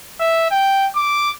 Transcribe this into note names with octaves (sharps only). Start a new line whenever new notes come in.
E5
G5
D6